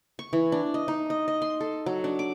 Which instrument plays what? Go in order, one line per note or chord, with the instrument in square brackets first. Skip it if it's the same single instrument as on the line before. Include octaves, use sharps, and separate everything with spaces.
[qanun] C#6
E3
D4
D#5
D#4
D#5
D#5
C6
A4
F#3
D4
D6